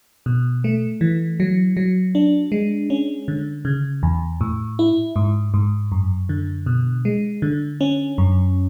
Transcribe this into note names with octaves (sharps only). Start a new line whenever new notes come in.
B2
A3
E3
F#3
F#3
D4
G#3
C#4
D3
C#3
E2
A2
E4
G#2
G#2
F#2
D3
B2
G#3
D3
C#4
F#2